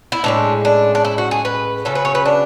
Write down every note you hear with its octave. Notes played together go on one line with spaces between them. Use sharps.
E4
A2 G#3 C#4 D4
D4
D4
E4
F#4
G#4
B4
C#3 F#3 C#4 A4
B4
C#5
B4
D4